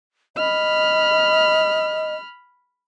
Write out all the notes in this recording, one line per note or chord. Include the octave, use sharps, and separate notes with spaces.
D#5 B5 F6